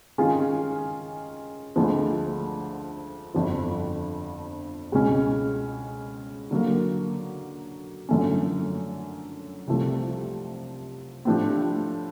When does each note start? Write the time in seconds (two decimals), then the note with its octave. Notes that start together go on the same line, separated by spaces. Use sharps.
0.18 D#3 G#3 C#4 F4 G#4
1.76 D2 D3 F3 G#3
3.34 G1 F2 D3 F3
4.92 C#2 B2 G#3 C#4
6.51 D3 F#3 A#3
8.09 F#2 D3 F3 A3 C#4
9.67 C2 C3 F3 A3
11.25 A2 F3 A3 D4 G4